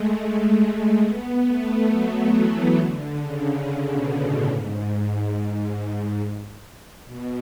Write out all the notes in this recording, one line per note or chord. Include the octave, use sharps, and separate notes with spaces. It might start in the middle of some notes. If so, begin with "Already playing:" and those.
Already playing: G#3 A3
A3
G#3
B3
A3
F#3
E3
D3
C#3
B2
A2
G#2
B2